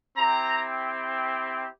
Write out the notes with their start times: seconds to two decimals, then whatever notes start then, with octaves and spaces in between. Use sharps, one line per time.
0.17 C4 E4 G4 A#5